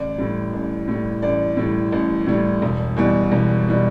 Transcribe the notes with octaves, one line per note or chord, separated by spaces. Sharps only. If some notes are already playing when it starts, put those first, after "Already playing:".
Already playing: A1 D5
A2 G3
A1
A2 G3
A1 D5
A2 G3
A1
A2 G3
E1
E2 B2 G3
E1
B2 G3